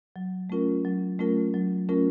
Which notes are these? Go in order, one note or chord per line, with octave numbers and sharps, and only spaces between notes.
F#3
A3 C#4 F4 A#4
F#3
A3 C#4 F4 A#4
F#3
A3 C#4 F4 A#4